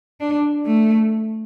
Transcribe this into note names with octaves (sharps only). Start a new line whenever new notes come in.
D4
A3